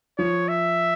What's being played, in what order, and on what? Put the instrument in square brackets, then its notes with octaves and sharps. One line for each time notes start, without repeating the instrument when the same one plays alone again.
[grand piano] F3 [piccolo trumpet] C#5
[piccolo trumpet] E5